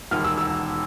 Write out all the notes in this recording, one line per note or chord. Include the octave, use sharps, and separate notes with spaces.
E1 D#2 D#3 F6
E6
E6